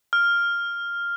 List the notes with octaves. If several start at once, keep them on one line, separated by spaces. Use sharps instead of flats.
F6